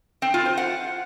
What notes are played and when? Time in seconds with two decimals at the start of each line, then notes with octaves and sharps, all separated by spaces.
0.22 C4
0.34 F4
0.46 C5
0.57 F#5